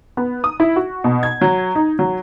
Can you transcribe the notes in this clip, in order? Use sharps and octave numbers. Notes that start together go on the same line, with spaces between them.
B3
D#6
E4
F#4
B2
G#6
F#3
D#4
F#3